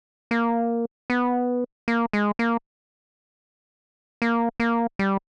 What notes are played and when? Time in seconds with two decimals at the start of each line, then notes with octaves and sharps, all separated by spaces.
0.31 A#3
1.10 B3
1.88 A#3
2.13 G#3
2.39 A#3
4.22 A#3
4.60 A#3
4.99 G3